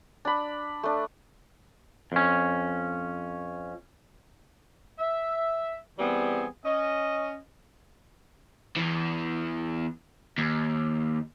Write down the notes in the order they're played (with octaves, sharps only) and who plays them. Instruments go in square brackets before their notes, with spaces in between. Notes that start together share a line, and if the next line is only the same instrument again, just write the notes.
[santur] D4 B5
A3 D4
[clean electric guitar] F2 C#4
[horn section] E5
E3 G3 B3 C4 G#4
C#4 D#5
[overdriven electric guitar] E2 E3
D#2